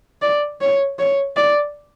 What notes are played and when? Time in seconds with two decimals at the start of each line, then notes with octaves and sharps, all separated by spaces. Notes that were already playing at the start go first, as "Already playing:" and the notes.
0.22 D5
0.61 C#5
0.99 C#5
1.36 D5